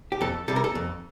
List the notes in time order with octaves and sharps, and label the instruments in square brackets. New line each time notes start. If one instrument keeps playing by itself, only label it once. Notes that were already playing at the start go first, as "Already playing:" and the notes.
[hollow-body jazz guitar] G4
F2 A4
C3 G3 A4
A#4
A4
F2